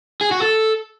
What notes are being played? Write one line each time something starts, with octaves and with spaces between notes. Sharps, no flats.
G#4
F#4
A4